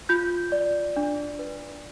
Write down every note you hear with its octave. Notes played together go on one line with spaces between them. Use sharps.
F4 G6
D5
D4
B4